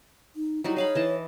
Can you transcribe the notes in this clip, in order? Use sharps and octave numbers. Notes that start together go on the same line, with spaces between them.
D#4
F#3 G3 D#4 E4
G#4 C#5 F5 B5
E3 D#5 A5